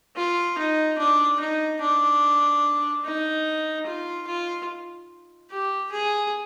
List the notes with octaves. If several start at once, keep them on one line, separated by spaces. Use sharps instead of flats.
F4
D#4
D4
D#4
D4
D#4
F4
F4
G4
G#4